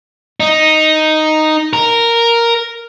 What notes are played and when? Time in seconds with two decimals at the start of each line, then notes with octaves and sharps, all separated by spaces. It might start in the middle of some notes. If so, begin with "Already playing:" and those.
0.40 D#4
1.73 A#4